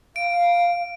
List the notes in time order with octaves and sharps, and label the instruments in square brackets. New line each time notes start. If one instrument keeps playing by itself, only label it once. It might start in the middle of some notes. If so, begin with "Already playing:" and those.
[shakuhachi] F5 [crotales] D7